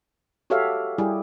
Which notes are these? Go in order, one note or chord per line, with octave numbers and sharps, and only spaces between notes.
F#4 G4 A4 C#5 E5 F5
G3 E4 G4 G#4